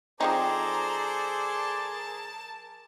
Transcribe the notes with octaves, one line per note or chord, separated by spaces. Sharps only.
F3 C4 D#4 G#4 A4 C5 D5 A#5
A#4 A5